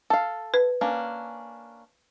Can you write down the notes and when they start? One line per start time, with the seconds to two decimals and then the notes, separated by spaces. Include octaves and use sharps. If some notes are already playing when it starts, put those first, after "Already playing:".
0.10 A4 F5
0.54 B4
0.81 A#3 C#4 D4